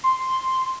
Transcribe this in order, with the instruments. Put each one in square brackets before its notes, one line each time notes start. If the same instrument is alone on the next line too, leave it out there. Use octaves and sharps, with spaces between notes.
[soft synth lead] C6